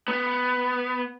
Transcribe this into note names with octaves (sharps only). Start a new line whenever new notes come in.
B3